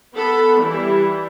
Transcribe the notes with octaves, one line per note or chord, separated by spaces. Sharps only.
B3 A4 B5
E3 G3 E4